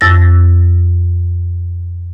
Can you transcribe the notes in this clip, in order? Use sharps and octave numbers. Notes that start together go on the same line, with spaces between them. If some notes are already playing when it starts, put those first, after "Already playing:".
F2 E6 A6 A#6